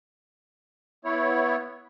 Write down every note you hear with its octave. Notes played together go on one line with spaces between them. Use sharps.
B3 E4 C#5